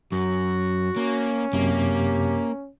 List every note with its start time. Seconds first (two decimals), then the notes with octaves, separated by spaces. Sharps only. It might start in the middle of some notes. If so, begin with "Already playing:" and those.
0.12 F#2 F#4
0.96 A#3 C#4
1.53 F#2 C3 F#3 A#3 G4